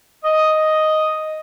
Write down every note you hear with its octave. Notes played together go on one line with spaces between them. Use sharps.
D#5